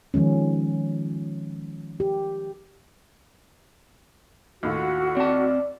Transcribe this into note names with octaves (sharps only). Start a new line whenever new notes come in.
D#3 F3 G#3 C#4
G4
D#2 A2 F4 F#4
C4 D5 A5